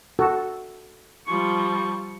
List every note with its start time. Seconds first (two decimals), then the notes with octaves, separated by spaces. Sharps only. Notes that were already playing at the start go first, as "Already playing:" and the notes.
0.19 F#4 A4
1.27 F3 G3 C#6